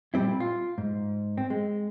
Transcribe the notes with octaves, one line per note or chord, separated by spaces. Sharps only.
A#2 G3 C4 E4
F4
G#2
C4
G#3